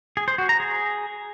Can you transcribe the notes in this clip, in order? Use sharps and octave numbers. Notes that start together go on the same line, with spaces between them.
G#4
C5
F#4
A#5
G#4